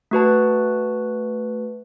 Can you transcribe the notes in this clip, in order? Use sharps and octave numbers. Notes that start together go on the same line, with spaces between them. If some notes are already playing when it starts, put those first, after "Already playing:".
A3 F#4 B4 A5